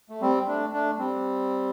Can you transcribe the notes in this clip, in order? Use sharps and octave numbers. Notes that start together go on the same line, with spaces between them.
A3
G3 C4
A3 D4
A3 D4
G3 C4